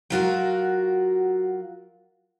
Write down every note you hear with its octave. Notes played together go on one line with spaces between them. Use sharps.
F#3 F4 F#4 A#4